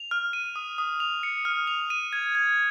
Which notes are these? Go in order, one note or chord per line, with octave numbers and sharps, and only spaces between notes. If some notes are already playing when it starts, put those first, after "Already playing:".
Already playing: F7
F6
D#7
D#6
D#6
F7
C#7
F6
F7
D#7
G#6
G#6